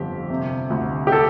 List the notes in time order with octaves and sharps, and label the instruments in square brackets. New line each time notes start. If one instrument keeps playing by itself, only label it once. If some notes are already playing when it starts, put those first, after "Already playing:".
Already playing: [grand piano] G1 F2 C4 G4
C3
D2
G4
A4